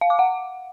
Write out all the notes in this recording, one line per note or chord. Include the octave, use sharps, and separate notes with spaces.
F5
D6
F#5